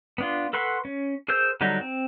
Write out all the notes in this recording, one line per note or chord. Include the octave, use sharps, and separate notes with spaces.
B3 D4 F4
A4 B4 F#5 C6 C#6
C#4
G#4 A#4 C5 E6 G6
D3 F#3 G3 D4 D#4
C4